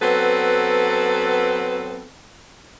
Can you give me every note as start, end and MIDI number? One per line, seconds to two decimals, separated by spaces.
0.01 2.05 54
0.01 2.05 59
0.01 2.05 60
0.01 2.05 69
0.01 2.05 71